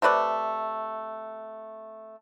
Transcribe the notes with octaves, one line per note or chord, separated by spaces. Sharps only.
C3 A3 B4 D5